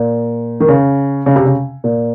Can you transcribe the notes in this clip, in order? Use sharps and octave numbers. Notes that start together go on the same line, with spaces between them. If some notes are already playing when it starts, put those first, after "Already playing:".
Already playing: A#2
D#3
C#3
C#3
C3
C#3
A#2